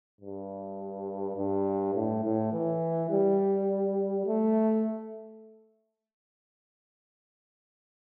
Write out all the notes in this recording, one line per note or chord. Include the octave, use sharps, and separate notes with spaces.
G2
G2
A2
A2
E3
G3
A3